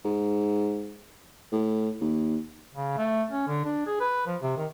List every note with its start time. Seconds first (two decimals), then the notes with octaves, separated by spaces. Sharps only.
0.04 G#2
1.52 A2
2.00 D#2
2.74 C#3
2.97 A3
3.31 C#4
3.47 D3
3.65 D4
3.87 G#4
4.01 B4
4.27 F3
4.42 C3
4.57 D#3